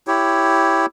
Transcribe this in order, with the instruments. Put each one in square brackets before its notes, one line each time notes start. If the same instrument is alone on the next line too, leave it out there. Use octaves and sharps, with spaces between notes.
[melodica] E4 G4 C#5